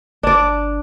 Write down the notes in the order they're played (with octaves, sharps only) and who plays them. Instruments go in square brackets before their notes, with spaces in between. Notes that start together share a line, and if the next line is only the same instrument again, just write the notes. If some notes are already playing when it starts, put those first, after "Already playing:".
[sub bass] G1 [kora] D4 D5